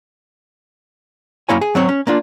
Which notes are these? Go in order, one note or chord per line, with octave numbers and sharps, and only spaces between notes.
F#2 A#3 E4 C#5 G#5
G#4
F#3 C4 C#5
C#4
A#3 D4 F4